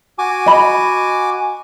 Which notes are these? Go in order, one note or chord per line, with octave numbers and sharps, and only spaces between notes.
F#4 G#5 D6
D#5 B5